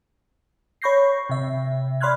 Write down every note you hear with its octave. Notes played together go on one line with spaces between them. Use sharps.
C#5 B5 C#6 G6 A#6 C7
C3 E5
D5 B5 C6 F6 F#6 G#6